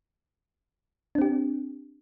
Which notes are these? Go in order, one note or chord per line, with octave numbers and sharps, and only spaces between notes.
C4 D4 G4